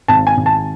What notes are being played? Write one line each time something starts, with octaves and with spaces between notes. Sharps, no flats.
G#1 A5
G#5
G#1
A5